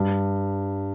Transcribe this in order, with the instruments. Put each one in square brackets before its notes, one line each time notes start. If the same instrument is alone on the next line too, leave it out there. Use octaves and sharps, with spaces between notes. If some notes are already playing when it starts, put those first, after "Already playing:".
Already playing: [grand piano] G2